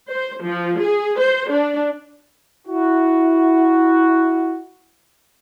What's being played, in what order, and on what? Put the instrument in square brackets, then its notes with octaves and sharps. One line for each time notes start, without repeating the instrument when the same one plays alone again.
[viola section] C5
F3
G#4
C5
D4
[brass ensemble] E4 F#4